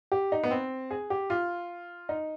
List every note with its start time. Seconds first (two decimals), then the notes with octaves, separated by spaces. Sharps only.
0.12 G4
0.32 D#4
0.44 B3
0.51 C4
0.91 G#4
1.10 G4
1.30 F4
2.09 D#4